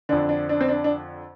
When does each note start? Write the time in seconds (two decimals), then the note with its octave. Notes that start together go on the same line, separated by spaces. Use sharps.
0.09 F2 D3 D4
0.29 D4
0.49 D4
0.61 C4
0.69 D4
0.84 D4